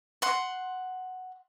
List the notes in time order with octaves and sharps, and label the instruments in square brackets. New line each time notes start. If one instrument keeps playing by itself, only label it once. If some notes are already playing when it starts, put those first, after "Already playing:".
[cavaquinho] F#5 C6